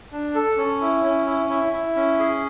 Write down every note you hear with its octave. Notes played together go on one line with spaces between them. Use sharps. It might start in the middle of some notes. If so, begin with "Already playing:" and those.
D4
A4
C#4
E4
C#4
E4
E4
E4
C#4
G#4